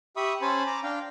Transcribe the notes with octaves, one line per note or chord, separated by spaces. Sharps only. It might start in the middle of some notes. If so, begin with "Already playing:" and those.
G4 E5 B5 C#6 D#6
C#4 C5 G#5 A5 B5
A#5 D6
D4 F5 G5